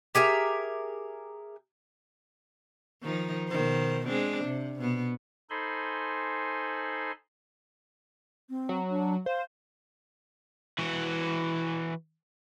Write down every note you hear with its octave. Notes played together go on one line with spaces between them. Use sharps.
G4 G#4 A#4 E5
D#3 F3 D#4
B2 D#3 C5
G#3 C4 D4
C3
B2 B3
D#4 A4 C5 G#5 B5 C6
C4
F#3
D4
C5 F5
E3 F#4